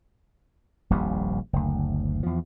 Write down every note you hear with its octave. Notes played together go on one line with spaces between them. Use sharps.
D#1 A#1 F2 G3
F#1 D2
E2 F3